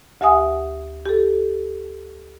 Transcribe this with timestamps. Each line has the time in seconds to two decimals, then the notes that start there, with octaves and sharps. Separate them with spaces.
0.21 D2 G4 E5 F#5 G#5 D#6
1.06 G4 A4